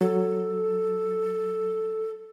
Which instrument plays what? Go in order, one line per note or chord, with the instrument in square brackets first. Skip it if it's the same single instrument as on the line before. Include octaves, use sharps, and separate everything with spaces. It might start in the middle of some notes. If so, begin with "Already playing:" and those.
[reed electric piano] F#3 [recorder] A4